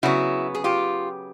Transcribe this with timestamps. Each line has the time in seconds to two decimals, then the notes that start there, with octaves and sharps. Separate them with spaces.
0.03 C#3 F#3 B3 E4 F#4
0.55 G#4
0.64 F4 G4